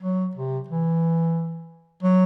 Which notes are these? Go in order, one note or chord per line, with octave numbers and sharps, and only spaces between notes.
F#3
C3
E3
F#3